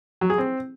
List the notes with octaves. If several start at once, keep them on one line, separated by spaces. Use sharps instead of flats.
F#3
G#4
C4